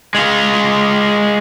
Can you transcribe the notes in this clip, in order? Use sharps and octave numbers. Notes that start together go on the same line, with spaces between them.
G#3 F4